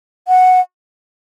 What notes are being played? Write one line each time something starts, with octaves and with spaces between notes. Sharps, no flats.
F#5